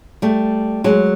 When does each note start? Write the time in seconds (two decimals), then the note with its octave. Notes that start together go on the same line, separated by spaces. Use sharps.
0.22 G3 A3
0.84 F#3 G#3